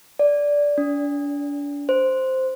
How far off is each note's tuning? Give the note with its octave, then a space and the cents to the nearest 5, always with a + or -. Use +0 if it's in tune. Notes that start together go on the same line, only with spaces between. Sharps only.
D5 -10
D4 -35
C5 -5